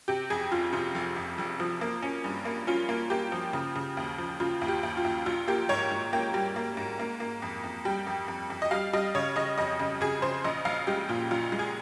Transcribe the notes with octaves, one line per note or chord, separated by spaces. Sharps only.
C3 G4
F2 G#4
F1 F4
C3 F4
F1
F2
F1
F3
A#3
C#4
G2
A#3
C#4 F4
A#3
A#3 G4
F3
C#3
C#3
D#2
F3
C#3 F4
D#2
G4
D#2
F4
D#2
A#1 F4
A#3 G4
G#2 C#5
G#2
A#3 G5
G3
A#3
G#2
A#3
A#3
F2
F2
G3 G5
F2
F2
F2
D#5
G3 F5
G3 D#5
C#3 C#5
C#3 D#5
F2 D#5
C#3
C#3 G#4
C#3 C5
A#1 D#5
A#1 F5
G#3 G4
A#2 F4
A#1 F4
G#3
G#4